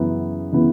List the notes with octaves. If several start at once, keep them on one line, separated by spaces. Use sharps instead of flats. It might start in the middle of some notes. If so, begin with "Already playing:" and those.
Already playing: F#2 C#3 E3 B3
C#3 E3 B3